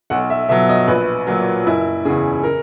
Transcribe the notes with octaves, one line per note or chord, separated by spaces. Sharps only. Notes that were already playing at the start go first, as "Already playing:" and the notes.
B1 F#5
E5
B2 F#3 E5
D#5
A#1 B4
A#2 F#3
F#1 E4
E2 C#3 G#4
A#4